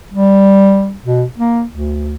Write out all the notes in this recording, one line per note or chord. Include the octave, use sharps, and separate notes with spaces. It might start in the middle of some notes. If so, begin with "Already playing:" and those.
G3
B2
A#3
D2